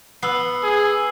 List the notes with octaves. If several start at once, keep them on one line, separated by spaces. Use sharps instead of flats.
B3 E6 C7
G#4